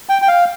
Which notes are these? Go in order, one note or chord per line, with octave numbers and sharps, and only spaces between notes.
G5
G5
F5